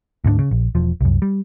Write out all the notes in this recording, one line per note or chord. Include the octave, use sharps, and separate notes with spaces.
D2 G#2 B3 D4
C#3
A#1
E1 F3
C2 F#2
G3